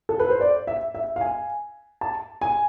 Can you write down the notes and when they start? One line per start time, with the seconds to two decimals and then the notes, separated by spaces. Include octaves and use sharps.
0.09 A4
0.20 B4
0.30 C5
0.41 D5
0.67 E5
0.95 E5
1.16 F5
1.21 G#5
2.01 A5
2.41 G#5